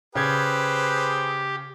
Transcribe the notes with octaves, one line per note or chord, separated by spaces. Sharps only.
C#3 G4 G#4 B4 C5 G#6